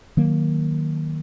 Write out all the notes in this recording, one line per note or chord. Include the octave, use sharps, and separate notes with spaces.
D#3 F#3 A#3